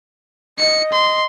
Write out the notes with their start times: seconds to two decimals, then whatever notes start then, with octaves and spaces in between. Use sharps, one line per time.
0.59 D#5 C#7
0.92 C6